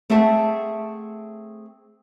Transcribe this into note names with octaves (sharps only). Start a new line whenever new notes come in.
A3 C4 G#4 E5 F#5 A5